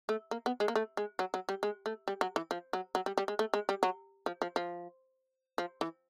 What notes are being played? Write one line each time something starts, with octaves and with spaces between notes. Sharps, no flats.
A3
A#3
B3
G#3
A#3
A3
G#3
F#3
F#3
G3
G#3
A3
G3
F#3
E3
F3
F#3
F#3
G3
G3
G#3
A3
G#3
G3
F#3
F3
F3
F3
F3
E3